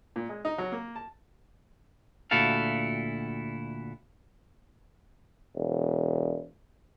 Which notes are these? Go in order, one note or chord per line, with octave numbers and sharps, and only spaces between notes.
A#2
G#3
D#4
F#3
A#3
A5
D2 A#2 E4 F#4 A4 F5
E1